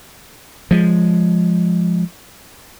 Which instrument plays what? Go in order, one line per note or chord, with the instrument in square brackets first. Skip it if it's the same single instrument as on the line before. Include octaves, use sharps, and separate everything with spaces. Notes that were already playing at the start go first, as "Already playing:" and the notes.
[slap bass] F3 G#3